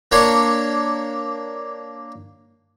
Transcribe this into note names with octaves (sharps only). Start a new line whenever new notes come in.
A#3 D4 C#5 C6